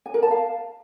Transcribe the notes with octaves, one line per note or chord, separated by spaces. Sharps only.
G#5
A#4
A5
F5